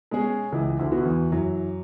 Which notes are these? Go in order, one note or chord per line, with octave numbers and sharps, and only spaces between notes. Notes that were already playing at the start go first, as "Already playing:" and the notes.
B2 G#3 C#4 G#4
C#2 C#3 E3
D2 D3
B3 F#4
D3
E2 E3
F#2 E3 F#3